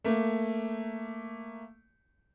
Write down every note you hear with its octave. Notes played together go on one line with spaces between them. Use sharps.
A3 A#3